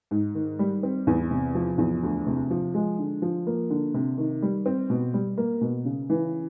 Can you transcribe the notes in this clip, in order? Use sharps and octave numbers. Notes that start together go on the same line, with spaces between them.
G#2
D#3
G3
C4
E2
C3
F3
E2
D2
C3
F3
G#3
D3
F3
A#3
D3
C3
D#3
G3
C4
B2
G3
A#3
B2
C#3
E3